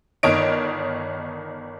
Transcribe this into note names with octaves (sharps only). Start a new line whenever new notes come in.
G1 D#3 C#5 D#5 D7